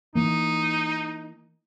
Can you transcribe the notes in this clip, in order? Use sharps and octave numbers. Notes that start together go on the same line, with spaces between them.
E3 A#3 D#4